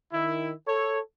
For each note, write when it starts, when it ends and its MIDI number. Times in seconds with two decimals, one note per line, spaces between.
0.13 0.52 51
0.13 0.52 64
0.67 0.99 69
0.67 0.99 73